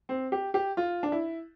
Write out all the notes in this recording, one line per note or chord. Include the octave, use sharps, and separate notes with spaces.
C4
G4
G4
F4
D4
E4